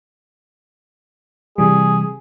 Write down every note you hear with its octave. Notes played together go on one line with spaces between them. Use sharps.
C3 E3 G3 G#4